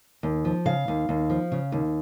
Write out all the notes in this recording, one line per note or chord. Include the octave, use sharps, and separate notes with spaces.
D#2
F3
C#3 F5
D#2
D#2
F3
C#3
D#2